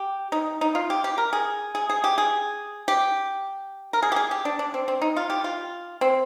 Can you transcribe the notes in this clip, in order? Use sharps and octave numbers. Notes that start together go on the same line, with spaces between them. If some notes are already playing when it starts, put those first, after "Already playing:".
Already playing: G4
D#4
D#4
F4
G4
G4
A#4
G#4
G#4
G#4
G4
G#4
G4
A#4
G#4
G4
G#4
G4
D4
D4
C4
C4
D#4
F4
G4
F4
C4